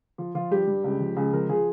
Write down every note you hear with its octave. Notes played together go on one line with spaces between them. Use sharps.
F3
F3 F4
G2 G4
G2
C#2
F3
C#2 G#4
F3 A#4
F3 G#4